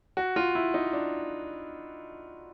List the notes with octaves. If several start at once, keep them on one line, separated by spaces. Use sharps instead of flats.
F#4
F4
E4
D#4
D4